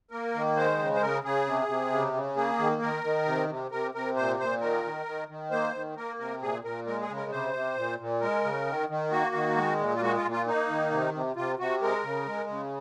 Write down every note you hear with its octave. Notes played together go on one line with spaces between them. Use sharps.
A#3 A#4
D#3
G#3 C5
C#3
C5
C#3 A#4
C#3 G#4
C3
C3
C#3
C#3
A#3 G#4
D#3
D#3 A#4
D#3
C3
C3
C3 A#4
C3 A#4
A#2 C5
A#2 C5
D#3 A#4
D#3
D#3
D#3
A#3 C5
D#3
A#3 A#4
C3 A#4
A#2 G#4
A#2 A#4
G#3 A#4
G#4
C#3
A#4
C3 C5
C3
A#2
A#2
G#3 A#4
C#3
D#3
D#3
A#3 F#4
D#3
G#3
A#2
F4
G#3 F#4
F4
A#2
F4
A#3 D#4
D#3
C3
C3
C3 F4
C3 F#4
G#3 A#4
C#3
G#3
C#3